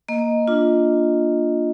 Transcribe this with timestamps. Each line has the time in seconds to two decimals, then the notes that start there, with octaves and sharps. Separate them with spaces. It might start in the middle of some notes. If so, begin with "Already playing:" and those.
0.08 A#3 D#5
0.48 D4 F4